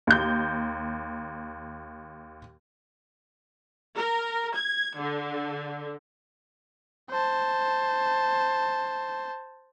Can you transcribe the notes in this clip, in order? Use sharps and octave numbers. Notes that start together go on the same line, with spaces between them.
D#2 G6
A#4
G#6
D3
C5 A5